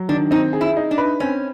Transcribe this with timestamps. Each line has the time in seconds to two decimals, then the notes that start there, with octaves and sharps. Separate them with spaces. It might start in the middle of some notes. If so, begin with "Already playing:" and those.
Already playing: F#3
0.09 D#3 D4
0.31 C4 D#4
0.53 G#4
0.61 E4
0.77 D#4
0.91 D4
0.98 B4
1.20 C4 C#4